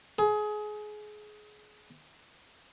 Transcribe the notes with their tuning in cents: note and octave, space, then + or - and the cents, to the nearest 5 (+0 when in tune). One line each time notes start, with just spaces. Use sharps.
G#4 +25